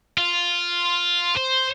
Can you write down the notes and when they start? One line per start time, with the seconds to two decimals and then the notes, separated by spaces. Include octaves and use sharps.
0.18 F4
1.37 C5